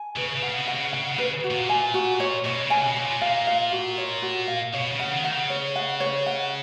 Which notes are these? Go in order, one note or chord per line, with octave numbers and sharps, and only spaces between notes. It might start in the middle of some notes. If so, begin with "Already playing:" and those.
Already playing: G#5
C#3 B4
C#3
F#5
B2
F#5
C#3
C#3 F#5
C#3
B4
F#4
A#2
G#5
F#4
C#5
B2 C#5
C#3
G#5
B2
C#5
A#2
A#2 F5
F5
F#4
C#5
F#4
F5
B2 C#5
C#3
F#5
D#3
F#5
C#3
C#5
F#5
C#5
F#5